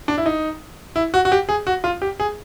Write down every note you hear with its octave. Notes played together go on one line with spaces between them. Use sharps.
D4
E4
D#4
E4
F#4
F#4
G4
G#4
F#4
F4
G4
G#4